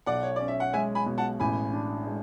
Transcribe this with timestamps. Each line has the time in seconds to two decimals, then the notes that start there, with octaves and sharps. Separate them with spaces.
0.06 B1 D5 F#5
0.23 C#5
0.36 C#4 D5
0.48 E5
0.60 F#5
0.73 G#3 E5 G#5
0.95 G#5 B5
1.06 B2
1.18 F#5 A5
1.40 A1 G#5 B5
1.73 D4
2.07 G#3